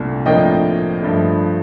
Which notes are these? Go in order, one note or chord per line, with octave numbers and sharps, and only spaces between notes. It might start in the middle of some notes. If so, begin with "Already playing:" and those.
Already playing: C2 A#2 A3 D4
A2 F3 A#3 D4 D#5 G5
G2 F3 A3 D4